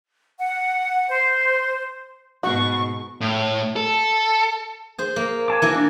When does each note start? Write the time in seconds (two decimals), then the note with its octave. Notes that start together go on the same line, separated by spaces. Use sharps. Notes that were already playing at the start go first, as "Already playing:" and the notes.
0.39 F#5
1.08 C5
2.43 G#2 B2 F#4 C#6
3.21 A2
3.76 A4
4.98 G#4 C5
5.16 A#3
5.48 G#5 A5 D6
5.62 E3 A#3 F#4
5.75 D4